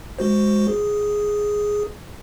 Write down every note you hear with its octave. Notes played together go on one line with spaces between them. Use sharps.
G#3 F#4 C5
G#4